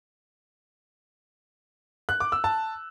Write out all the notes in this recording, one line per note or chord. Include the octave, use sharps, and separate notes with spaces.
F#6
D6
E6
A5